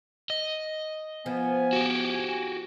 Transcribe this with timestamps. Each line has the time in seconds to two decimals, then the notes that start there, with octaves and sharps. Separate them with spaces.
0.30 D#5
1.26 F3 B3 G#5
1.73 F#4 G4